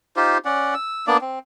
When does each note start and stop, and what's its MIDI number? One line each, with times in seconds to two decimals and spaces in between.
0.16 0.38 63
0.16 0.38 65
0.16 0.38 67
0.16 0.38 72
0.45 0.74 61
0.45 0.74 74
0.45 0.74 78
0.74 1.05 88
1.07 1.17 58
1.07 1.17 59
1.07 1.17 62
1.07 1.17 74
1.21 1.39 60